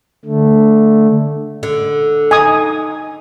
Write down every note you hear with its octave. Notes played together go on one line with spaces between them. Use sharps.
D3 A3
D3
D#4 G#5 D#6